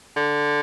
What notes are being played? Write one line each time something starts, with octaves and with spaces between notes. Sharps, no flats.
D3